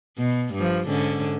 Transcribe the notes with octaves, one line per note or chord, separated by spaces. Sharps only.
B2
G2 F3
G#2 D3 C#4